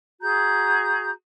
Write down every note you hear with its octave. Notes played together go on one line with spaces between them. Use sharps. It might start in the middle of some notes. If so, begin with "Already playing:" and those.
F#4 G#4 A#5 G6